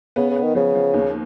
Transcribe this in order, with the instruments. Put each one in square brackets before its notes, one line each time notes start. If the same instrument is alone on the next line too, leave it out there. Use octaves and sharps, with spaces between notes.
[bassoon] C#3 [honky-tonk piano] B3
[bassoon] C#3
[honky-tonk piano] B3
[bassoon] D#3
[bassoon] C#3 [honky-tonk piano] F3
[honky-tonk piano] F3
D#2